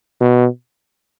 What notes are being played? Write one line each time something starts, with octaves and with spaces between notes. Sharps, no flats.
B2